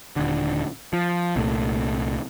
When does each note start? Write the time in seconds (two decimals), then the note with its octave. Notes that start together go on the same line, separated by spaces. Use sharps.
0.16 D#1 D3
0.93 F3
1.36 C2 A#2 A3